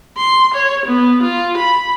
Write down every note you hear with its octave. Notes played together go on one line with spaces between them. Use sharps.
C6
C#5
B3
F4
B5